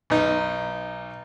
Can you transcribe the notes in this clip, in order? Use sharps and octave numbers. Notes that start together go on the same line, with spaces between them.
B1 D#4